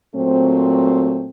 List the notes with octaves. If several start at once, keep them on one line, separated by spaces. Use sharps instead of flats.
A#2 F#3 A3 C4